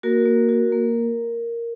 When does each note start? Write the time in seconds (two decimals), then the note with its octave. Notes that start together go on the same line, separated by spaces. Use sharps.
0.03 A#3 F#4 A#4
0.25 A#3
0.49 F#4
0.72 A#3